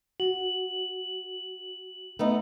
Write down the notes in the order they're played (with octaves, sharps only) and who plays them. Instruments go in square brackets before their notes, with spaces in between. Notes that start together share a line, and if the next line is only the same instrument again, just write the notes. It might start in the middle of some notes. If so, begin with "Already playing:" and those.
[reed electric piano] F#4 [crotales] F#7
[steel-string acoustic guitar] A3 B3 D#4